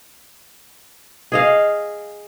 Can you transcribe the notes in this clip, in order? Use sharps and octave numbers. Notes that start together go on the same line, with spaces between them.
G#4 D#5 F5